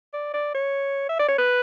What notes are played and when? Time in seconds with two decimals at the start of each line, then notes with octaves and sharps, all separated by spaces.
0.13 D5
0.34 D5
0.54 C#5
1.09 E5
1.19 D5
1.28 C#5
1.38 B4